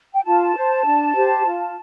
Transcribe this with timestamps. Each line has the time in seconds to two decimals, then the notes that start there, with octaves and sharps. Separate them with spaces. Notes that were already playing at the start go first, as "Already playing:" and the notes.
0.13 G5
0.24 F4 A5
0.55 C5
0.85 D4
1.14 G4 C5
1.45 F4